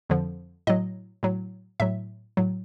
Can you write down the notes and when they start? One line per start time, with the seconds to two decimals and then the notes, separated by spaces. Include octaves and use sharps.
0.09 F2 D3 F3
0.67 A2 F#3 D#5
1.23 A2 F#3
1.80 A2 F#3 E5
2.37 A2 F#3